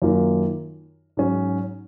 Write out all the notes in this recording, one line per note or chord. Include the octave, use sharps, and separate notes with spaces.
F#2 D#3 A#3 F4 A#4
G#2 F#3 C#4 F#4